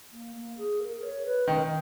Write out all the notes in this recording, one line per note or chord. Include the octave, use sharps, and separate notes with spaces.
A#3
A#3
G#4
A#4
C#5
B4
D#3